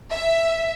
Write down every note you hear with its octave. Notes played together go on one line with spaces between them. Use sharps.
E5